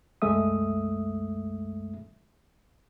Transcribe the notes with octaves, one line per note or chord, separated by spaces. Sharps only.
C2 F#2 G#3 A3 E5 D#6